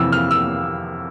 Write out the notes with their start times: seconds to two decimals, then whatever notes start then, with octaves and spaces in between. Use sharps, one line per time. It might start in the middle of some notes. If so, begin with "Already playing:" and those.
Already playing: F2 C3 E3 E6
0.12 F6
0.31 E6